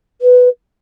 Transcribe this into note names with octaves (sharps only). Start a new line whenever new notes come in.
B4